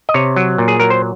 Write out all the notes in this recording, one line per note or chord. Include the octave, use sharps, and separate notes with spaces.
D#5
C3 C#5
F#3
A#2
G#4
F#3 A#4
C5